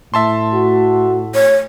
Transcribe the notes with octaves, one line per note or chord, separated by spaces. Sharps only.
A2 E5 A5 C6
F#4
C#5